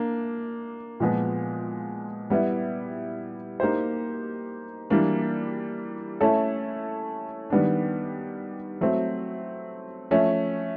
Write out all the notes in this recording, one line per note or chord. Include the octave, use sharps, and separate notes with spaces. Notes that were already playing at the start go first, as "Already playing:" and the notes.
Already playing: A#3 D4
A#2 F3 G#3 B3
G3 B3 E4
A#3 D#4 G4 C5
E3 G3 A#3 D4
A3 C#4 E4 A4
D#3 G3 B3 D4
F#3 A3 C4
F3 A3 C#4